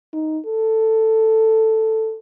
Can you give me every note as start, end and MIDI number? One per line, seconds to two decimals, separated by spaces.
0.13 0.39 63
0.46 2.18 69